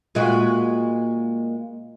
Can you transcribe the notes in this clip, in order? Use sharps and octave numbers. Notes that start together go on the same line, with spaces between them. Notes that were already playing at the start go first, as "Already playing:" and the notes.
A#2 G#3 F#4